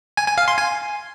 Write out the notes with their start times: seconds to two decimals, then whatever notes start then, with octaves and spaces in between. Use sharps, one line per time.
0.17 G#5
0.27 G#5
0.38 F5
0.48 C6
0.58 G#5